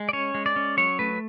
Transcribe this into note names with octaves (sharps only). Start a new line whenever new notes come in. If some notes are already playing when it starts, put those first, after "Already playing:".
Already playing: G#3
D5
C#4 C#5
G#3
D5
C#4
F#3 C#5
A3 B4